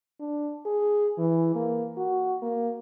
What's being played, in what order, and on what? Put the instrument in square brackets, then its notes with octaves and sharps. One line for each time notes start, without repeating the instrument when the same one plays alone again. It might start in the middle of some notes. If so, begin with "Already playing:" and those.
[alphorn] D4
G#4
E3
A#3
F#4
A#3